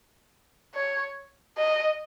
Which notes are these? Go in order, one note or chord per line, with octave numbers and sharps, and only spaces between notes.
C#5
D#5